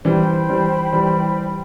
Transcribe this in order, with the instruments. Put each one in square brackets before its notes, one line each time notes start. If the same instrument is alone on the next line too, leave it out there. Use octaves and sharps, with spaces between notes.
[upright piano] E3 G3 [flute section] C5 G5 B5
[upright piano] E3 G3
E3 G3